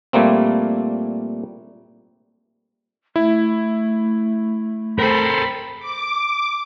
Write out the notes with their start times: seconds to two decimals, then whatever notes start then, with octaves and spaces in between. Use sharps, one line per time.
0.13 A#2 G3 A3 A#3 C4
3.16 A3 E4
4.99 C4 A4 A#4 C5 B5
5.79 D6